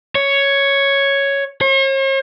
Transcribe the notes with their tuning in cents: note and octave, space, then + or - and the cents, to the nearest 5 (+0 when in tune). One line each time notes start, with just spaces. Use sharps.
C#5 +0
C#5 -45